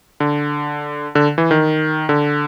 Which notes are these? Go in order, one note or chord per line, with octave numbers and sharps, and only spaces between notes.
D3
D3
E3
D#3
D3